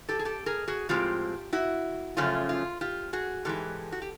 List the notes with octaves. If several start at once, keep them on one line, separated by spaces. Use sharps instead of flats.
G4 A4
G#4
G4 A4
G#4 A#4
F#4 G#4
A2 F3 G#3 C4 F4 G4
E4 F#4
F#2 C#3 F3 A3 C#4 F4
F4
F4 G4
F#4 G#4
G#2 E3 G#3 G4 A4
F#4
G4